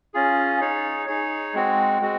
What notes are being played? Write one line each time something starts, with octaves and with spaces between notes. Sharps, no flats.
C#4 F4 G#4
D#4 G#4 C#5
D#4 G#4 C#5
G#3 C4 F#4
G#3 C4 F#4